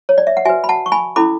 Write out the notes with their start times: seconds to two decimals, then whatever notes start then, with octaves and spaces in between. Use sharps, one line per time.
0.09 C#5
0.18 D5
0.27 E5
0.37 F#5
0.45 F#4 E5 G#5
0.49 B4
0.64 B5
0.69 F#5 A5
0.86 C#6
0.92 G#5 B5
1.16 C#4 E4 A4 B5 D6